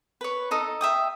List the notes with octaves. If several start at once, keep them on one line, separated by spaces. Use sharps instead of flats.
B4 C#5
D#4 A4 D#5
E5 G5 D#6